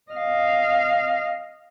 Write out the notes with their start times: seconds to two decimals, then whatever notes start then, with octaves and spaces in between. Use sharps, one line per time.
0.11 D#5 F5